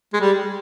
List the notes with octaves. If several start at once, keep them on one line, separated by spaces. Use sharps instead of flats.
G#3
G3